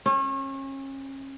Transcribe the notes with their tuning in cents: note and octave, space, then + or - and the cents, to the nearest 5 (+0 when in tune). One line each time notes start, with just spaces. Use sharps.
C#4 -35